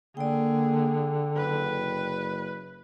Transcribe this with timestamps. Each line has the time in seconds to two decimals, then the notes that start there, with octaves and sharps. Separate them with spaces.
0.17 D3 A#3 G#4 D5 G5
1.36 F#1 B4